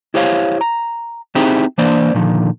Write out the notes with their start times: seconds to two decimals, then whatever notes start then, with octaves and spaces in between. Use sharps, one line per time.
0.14 E4 G4 C5 C#5 F5
0.61 A#5
1.35 C4 D#4 E4 G4 G#4 C5
1.78 E3 A#3 D4 C5 D5
2.14 A#2 D3 D#3 F3